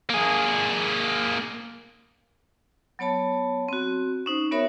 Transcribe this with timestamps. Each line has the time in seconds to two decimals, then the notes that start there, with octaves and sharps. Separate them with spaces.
0.09 A#3 G#4
2.99 F#3 B3 C#5 A5 B5
3.69 C4 F#4
4.26 C#4 D#4 C5
4.52 B3 F#4 A#4 C#5 E5 B5